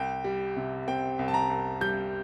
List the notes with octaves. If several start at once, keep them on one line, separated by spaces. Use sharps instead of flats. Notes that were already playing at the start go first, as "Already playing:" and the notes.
Already playing: C2 G5
G3
C3
C4 G5
C2
A5
A#5
C2
G3 G6